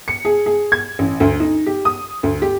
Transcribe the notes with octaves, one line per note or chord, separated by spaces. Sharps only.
C#7
G#4
G#4
G#6
A1
D2
D#4
G4
D#6
D2
G4